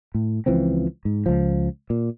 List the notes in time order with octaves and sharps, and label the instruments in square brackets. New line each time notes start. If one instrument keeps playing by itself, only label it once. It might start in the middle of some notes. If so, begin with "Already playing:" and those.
[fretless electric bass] A2
C#2 E3 F3 C4
G#2
C#2 F3
A#2